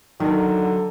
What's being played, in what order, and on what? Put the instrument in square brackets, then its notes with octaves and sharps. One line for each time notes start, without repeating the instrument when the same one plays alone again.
[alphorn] D3 [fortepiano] D#3 [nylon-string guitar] F#3